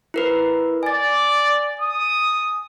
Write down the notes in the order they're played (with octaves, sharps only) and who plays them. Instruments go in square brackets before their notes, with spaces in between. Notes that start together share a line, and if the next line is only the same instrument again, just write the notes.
[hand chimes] E4 A#4 B4
[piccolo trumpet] D5 [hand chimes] G#5 A6
[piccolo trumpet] D#6